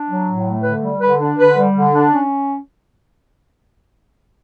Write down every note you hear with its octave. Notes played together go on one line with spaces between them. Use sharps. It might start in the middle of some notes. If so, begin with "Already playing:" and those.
Already playing: D4
F#3
A2
A3
D3 B4
G3
D3 B4
D4
D3 B4
G3
D3
D4
C#4